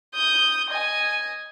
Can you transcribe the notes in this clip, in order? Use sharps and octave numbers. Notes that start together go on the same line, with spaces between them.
D#6 G6
D#5 G#5